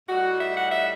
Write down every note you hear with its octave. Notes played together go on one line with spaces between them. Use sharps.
A2 G3 D#4 F#4
E5
F#5
E5